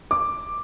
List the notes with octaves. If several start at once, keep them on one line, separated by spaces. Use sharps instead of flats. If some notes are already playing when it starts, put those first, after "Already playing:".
D6